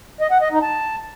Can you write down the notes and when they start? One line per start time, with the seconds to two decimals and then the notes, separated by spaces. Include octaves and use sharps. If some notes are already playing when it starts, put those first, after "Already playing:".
0.21 D#5
0.31 F#5
0.41 D#5
0.52 D#4
0.62 A5